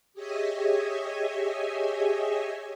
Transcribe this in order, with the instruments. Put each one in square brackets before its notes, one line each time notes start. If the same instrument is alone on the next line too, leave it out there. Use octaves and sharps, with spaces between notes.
[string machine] G4 G#4 C#5 D#5 E5 G#5